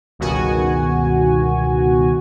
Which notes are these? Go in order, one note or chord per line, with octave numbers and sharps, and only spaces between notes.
G1 C#2 B2 D#3 F#4 G#5